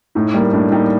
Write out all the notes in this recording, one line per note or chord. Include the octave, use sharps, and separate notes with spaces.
A2 D#4
G3 A#3
A2 D4
G3 A#3 D#4